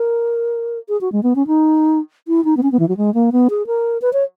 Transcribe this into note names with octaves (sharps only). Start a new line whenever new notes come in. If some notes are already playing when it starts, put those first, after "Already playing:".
Already playing: A#4
G#4
F#4
G#3
B3
C#4
D#4
E4
D#4
B3
C#4
B3
E3
F#3
G#3
A#3
B3
G#4
A#4
B4
C#5